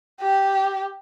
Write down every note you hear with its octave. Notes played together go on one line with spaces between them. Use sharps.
G4